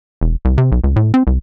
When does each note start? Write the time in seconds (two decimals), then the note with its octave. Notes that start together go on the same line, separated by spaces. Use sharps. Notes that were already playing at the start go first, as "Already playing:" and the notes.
0.21 E1
0.45 C2
0.58 C3
0.72 B1
0.84 C#2
0.96 A2
1.14 C4
1.27 C2